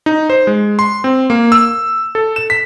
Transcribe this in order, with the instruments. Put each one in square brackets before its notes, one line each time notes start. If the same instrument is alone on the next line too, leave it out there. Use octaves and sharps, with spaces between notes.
[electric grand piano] D#4
C5
G#3
C6
C4
A#3
E6
A4
E7
B6